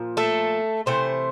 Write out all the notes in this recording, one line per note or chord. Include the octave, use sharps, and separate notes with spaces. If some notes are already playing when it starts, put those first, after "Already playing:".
Already playing: A#2 F3
A3 A4
C3 E3 A3 E4 C5